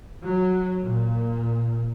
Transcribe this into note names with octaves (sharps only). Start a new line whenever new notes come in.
F#3
A#2